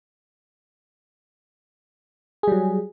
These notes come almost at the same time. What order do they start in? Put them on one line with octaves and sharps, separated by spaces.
G#4 G3 F#3